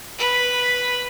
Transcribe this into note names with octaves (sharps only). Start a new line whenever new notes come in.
B4